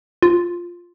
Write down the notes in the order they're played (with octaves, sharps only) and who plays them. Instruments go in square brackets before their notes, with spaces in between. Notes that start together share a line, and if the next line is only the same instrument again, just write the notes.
[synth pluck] F4